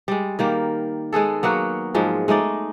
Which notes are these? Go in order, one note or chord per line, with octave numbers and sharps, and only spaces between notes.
G3 G#3
D#3 G3 A#3
G#3 B3 G#4 A4
F#3 A#3 B3 F#4
G#2 F3 F#3 G#3
G#3 A3 D#4 D5